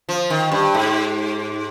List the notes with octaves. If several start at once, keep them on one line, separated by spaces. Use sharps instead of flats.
F3
D#3
G2
G#2